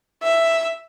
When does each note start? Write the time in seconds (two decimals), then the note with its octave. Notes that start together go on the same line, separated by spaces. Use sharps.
0.23 E5